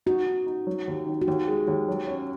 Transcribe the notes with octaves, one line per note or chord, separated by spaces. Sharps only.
D#4 F#4
D#4
D#4
F#3
D#2
D#3
F#4
D#2 D#4
G#3
D#2
F#3
C#4